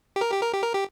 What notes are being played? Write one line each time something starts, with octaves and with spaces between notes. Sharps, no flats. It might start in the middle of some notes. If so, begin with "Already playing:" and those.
G4
A#4
G4
A#4
G4
A#4
G4